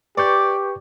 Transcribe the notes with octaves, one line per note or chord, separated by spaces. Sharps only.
G4 B4 D5 C#6 G6